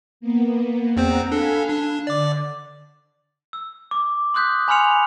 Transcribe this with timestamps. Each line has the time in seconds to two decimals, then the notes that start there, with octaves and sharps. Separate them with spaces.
0.20 A#3 B3
0.96 E2 C4 C5 F#5 A#5
1.32 D4 A4 F5 G#5 B5
1.69 D4
2.07 D3 D5 D6
3.53 E6
3.91 D6
4.34 C6 D#6 F#6 G6 B6
4.68 G#5 B5 C6 F6 C#7 F7